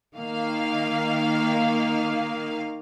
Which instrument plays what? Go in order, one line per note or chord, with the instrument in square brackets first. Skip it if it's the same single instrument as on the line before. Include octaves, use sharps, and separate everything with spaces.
[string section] D#3 A#3 F5